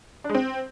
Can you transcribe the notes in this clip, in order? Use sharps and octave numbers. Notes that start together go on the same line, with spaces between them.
D4
G#3
C4